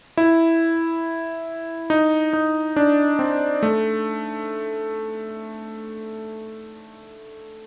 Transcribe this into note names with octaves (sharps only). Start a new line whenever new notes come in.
E4
D#4
D#4
D4
C4
A3